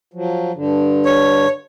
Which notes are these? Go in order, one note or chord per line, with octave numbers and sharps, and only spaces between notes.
F3 F#3
G2 D3
C#5